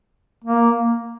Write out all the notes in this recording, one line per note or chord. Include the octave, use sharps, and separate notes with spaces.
A#3